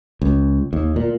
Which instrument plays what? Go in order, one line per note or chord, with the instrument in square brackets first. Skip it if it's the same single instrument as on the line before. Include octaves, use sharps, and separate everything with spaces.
[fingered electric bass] C#2
D#2
A#2